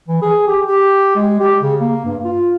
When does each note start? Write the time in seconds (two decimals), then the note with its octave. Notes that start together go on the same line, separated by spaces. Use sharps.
0.08 E3
0.22 G#4
0.47 G4
0.66 G4
1.16 G#3
1.40 G4
1.62 C#3
1.81 A#3
2.05 G2
2.24 F4